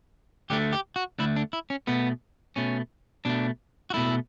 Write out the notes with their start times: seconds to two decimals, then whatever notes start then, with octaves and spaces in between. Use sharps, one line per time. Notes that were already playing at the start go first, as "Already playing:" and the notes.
0.50 D2 D3 A3 G4
0.73 G4
0.96 F#4
1.19 D2 D3 A3 E4
1.36 D4
1.53 E4
1.70 C#4
1.87 B2 A3 B3
2.56 B2 A3 C#4
3.25 B2 A3 D4
3.90 F#4
3.94 B2 A3 E4